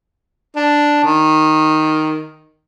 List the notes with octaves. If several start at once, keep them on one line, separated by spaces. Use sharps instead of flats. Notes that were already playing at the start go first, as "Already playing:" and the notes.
D4
D#3